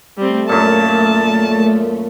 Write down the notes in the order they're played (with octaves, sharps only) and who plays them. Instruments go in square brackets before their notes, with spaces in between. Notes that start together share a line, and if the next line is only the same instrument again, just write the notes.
[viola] G3 C4 [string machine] A3
[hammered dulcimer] F#2 A#2 [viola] A5